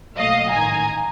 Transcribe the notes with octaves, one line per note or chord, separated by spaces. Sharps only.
B1 A#2 F#3 A3 D#5 F5
A1 G#2 D#3 G#5 A#5